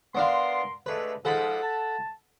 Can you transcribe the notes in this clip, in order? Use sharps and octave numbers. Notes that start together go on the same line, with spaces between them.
B3 D4 A#4 F5 C6
D3 G#3 A3 B4
G#2 F3 A4 F#5 B5
A5